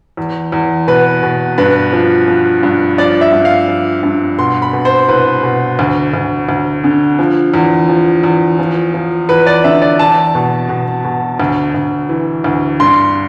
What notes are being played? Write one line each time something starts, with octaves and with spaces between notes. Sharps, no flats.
E2
E2
B2 B4
B2
G2 B4
F3
F3
G2
F3 D5
E5
G2
F5
F3
G2
B2 C6
B5
B2
C5
C2 B4
B2
D2
D2
D2
D3
F3
E2
F3
E2
F3
F3
E2 B4
D5
D3 E5
D5
E2 A5
B2
B2
B2
D2
D2
E3
D2
G2 C6